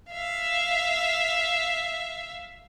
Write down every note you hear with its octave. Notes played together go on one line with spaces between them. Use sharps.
E5 F5